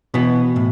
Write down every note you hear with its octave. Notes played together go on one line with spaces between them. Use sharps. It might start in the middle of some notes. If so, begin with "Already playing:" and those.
B2 E3 B3
A2